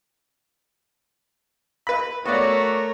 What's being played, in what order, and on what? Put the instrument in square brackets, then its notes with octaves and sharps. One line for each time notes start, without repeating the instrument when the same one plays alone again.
[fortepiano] B4 B5
[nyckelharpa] A3 A#4 [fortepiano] B3 D5 [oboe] F#4 [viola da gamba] C#5